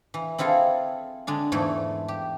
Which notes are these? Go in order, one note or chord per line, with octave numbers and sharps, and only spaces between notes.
E3
C4 E4 F4 G#4 A4
D3 G#3 D4
E2 G#2 A3 E4
G4